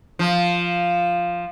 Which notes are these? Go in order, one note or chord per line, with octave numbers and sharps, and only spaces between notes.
F3